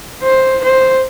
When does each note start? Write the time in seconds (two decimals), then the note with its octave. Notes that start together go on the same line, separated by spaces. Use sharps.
0.23 C5
0.64 C5